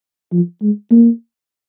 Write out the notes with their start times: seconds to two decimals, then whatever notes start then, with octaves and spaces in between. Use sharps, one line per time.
0.32 F3
0.62 G#3
0.91 A#3